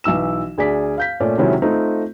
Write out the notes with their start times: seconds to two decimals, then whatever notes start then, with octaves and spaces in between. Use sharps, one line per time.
0.04 B1 E3 E6 E7
0.58 D2 G#4 D5 B6
0.98 F5 G6 B6
1.20 A#2 A3 C#4 D5
1.38 C3 D#3 F#3 G#3 C#4 E4
1.62 A3 C4 D#4 F4